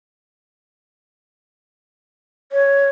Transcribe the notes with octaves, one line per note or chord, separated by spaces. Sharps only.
C#5